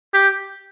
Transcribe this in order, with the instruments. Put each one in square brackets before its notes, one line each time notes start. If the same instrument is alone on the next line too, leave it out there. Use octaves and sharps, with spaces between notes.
[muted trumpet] G4